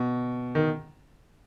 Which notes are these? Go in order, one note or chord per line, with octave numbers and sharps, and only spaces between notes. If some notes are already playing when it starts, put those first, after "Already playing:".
Already playing: B2
D#3